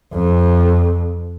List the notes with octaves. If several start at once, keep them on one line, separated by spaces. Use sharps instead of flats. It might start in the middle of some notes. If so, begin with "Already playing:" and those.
F2